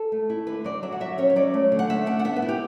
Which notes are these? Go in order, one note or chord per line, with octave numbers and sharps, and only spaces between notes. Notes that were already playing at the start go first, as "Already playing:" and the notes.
Already playing: A4
A3
E4
D3 B4
F#3 D5
F#3 E5
F#5
F#3 E5
C#4 C#5
C#5
F#3 D5
A3
D3
F#5
A3 E5
D4 F#5
F#5
B3 E5
B4
E4
G4